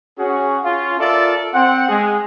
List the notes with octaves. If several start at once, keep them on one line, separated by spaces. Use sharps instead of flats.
C#4 F#4 G#4
C#4 F4
F4 A4 A#4 D5 E5 A5
C4 F#5
G#3 G#4